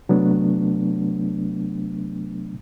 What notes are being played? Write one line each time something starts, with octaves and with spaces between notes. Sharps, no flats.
C3 F#3 A3 B3 D4